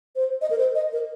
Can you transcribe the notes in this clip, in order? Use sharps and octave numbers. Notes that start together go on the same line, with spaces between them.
C5
D#5
A#4
C5
D#5
A#4